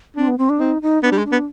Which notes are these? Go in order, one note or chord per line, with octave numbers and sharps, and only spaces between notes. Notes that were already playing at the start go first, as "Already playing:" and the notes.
C4 D4
B3
C4
D4
C4 D#4
D#4
B3 D4
G3
G#3
D4
B3